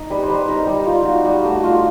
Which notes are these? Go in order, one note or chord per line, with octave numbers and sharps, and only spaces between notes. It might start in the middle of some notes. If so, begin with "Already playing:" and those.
Already playing: D#4
G3 B4
C5
G3 B4
D#4 A#4
G3
D#4 F4
D#4 F#4
G3 F#4
A3 F#4
A3 F4